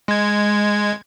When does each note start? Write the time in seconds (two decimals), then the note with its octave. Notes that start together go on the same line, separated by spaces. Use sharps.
0.08 G#3 G#6